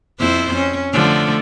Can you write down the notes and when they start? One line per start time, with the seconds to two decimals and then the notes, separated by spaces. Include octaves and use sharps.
0.19 F2 E4 C5
0.55 C#4
0.93 D3 F3 A3